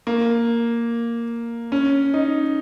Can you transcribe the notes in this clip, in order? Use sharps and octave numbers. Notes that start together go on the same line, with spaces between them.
A#3
C#4
D#4